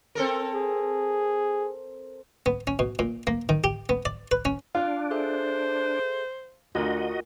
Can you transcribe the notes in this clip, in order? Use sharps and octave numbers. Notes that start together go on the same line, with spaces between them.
C4 A4 A#4
G#4
B3
C#4
B2
A#2
A#3
D#3
G4
B3
D5
B4
C#4
D4 F4 F5
G#4 A4 C5 E5
D2 D4 F4 F#4 A#4 D#5